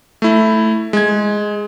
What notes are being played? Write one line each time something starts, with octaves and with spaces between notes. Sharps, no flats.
A3 E4
G#3 G#6